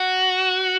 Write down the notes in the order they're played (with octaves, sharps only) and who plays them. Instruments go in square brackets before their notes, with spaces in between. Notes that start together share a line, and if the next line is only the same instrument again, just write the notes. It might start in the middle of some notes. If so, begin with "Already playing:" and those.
Already playing: [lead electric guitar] F#4